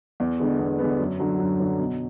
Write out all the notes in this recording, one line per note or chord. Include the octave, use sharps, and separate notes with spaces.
E2
D3 G#3 B3
E2
D3 G#3 B3
F#2
D3 F#3
F#2
D3 F#3
B2